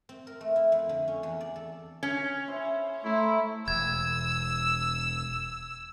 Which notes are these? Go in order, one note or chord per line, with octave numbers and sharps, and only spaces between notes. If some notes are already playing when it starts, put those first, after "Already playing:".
C4
A#4
A3
E4
F2
D3
C#4
E2
D5
A4
C#4
E4 G#4 C5
A3 E4 E5 A#5 C6
E1 E6 G#6